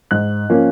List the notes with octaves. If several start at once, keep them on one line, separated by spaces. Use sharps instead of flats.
G#2 F#6
F3 A#3 C#4